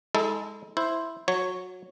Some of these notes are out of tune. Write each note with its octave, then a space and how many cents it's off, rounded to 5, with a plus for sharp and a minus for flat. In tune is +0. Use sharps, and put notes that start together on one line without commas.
G#3 -10 E4 -45 A4 +0
E4 +0 C5 +0
F#3 -20 C#5 +0